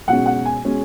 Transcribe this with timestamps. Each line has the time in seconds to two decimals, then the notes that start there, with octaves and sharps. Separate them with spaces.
0.08 B1 B2 G#3 C#4 F#5
0.26 F#5
0.45 G#5
0.64 B2 G#3 C#4